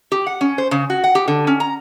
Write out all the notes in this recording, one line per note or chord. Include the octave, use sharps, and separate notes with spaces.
G4
F#5
C#4
C5
C#3
F#4
F#5
G4
D3
C#4
A#5